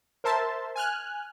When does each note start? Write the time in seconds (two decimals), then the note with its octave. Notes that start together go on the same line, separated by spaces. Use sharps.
0.24 A#4 C5 E5 A5 C6
0.75 G#5 F6 F#6